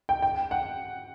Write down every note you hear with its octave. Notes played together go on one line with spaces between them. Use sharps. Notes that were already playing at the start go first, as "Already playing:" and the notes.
G5
G5
F#5